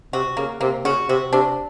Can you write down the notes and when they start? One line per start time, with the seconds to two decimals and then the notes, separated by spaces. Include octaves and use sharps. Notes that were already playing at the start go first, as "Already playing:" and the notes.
0.13 C3 F#4
0.37 C#3 A#3
0.61 C3 A#3
0.85 C#3 F#4
1.09 C3 F#4
1.33 C3 D4